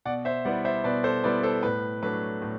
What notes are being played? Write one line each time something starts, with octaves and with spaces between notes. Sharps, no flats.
B2 D5 F#5
C5 E5
G3 B3 E4 D5 F#5
C5 E5
B2 B4 D5
A4 C5
G3 B3 E4 B4 D5
A4 C5
A2 B4
F#3 A3 D4 B4
A2